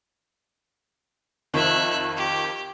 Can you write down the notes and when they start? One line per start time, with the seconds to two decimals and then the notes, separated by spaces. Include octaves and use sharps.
1.54 F2 D#3 E5 F#6
2.16 G4